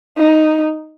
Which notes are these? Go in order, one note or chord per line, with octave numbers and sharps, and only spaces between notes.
D#4